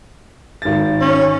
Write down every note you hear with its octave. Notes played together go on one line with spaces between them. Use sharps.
G#1 A6
C#4